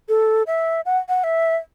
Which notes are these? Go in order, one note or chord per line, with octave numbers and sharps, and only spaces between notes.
A4
E5
F#5
F#5
E5